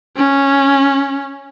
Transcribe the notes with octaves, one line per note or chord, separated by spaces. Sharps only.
C#4